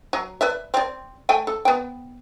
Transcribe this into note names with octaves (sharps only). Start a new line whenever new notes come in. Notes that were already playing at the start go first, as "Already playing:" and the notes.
F#3
B4 D5 E5
C4 D5
A3 G5 G#5
A4
B3 G5